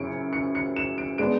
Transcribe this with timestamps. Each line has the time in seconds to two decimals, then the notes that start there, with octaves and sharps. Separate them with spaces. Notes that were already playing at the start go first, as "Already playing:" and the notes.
Already playing: F#2 C#3 C#4 E4 C#7 D7
0.33 C#7
0.55 C#7
0.76 E7
0.98 D7
1.18 G#3 B3 D4 D7